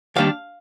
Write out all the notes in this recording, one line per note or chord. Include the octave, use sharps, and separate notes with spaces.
D#2 D#3 G3 D4 F5